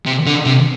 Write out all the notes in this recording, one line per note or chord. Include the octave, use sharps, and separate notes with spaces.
C3
D3
C3